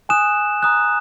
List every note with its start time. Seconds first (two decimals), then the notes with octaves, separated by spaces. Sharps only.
0.09 G#5 D#6 F#6 E7
0.63 A#5 D#6 F#6